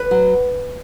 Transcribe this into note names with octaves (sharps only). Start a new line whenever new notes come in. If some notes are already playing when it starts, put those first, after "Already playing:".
Already playing: B4
F#3